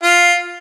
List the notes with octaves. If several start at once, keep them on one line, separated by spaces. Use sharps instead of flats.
F4